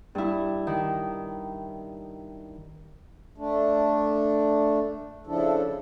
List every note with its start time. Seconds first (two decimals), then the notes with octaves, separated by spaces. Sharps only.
0.15 G2 E4
0.67 D#3
3.38 A3 D4
5.27 C#3 F3 D4 E4 A4